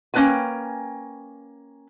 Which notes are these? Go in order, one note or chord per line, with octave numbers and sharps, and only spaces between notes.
A#3 C#4 D4 B4 G5 G#5